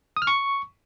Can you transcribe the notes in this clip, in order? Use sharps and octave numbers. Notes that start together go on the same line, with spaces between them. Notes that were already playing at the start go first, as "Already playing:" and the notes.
D#6
F6
C#6